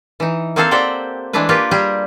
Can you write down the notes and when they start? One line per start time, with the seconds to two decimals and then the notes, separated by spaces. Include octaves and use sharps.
0.20 E3 D#4
0.56 A#3 C4 G#4 A4 C5 F5
0.71 G4 C5 D5 F#5 G5
1.33 E3 G#3 A3 D4 B4
1.49 A#3 F4 G4 A#4 B4
1.71 G3 G4 G#4